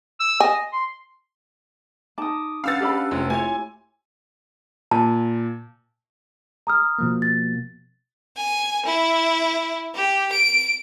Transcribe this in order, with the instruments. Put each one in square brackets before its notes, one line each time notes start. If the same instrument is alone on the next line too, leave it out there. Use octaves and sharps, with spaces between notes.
[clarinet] E6
[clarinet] D#5 [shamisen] G#5
[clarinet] C6
[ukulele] D#4 A5 [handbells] D6 D#6
[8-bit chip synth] C#4 D4 B4 [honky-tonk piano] F5 E6 A6 [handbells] F#5 B5
[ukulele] G4 D5 B5 [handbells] A4
[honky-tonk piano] F1 [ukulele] F4 C#5
[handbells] A3 G4 [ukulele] E4 F4 C#5 [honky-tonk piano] G#5
[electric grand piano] A#2 [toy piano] A5
[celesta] A#5 D#6 F6
[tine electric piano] B2 F3 A#3
[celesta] A6
[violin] G#5
E4
G4
D7